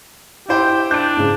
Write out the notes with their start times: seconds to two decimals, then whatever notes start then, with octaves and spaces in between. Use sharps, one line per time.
0.49 E4 G4 C5 G5
0.91 D4 G6 D7
1.17 G#2 C#3